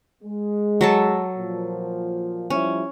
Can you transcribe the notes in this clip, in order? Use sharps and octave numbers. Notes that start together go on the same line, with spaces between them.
G#3
F#3 A4 A5
A#2 F3
F3 G3 C#4 E4